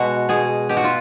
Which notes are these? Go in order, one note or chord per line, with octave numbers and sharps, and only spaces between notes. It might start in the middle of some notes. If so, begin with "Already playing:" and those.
Already playing: B2 G#3 F#4
B2 G#4
B2 G4
F#4
F4